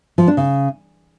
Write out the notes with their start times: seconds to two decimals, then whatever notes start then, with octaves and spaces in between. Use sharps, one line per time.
0.18 F3
0.28 D4
0.37 C#3